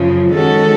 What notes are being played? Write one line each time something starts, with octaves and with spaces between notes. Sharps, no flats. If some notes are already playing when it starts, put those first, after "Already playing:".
Already playing: F#2 C#3 F3
D#3 G#3 C#4 F#4 A4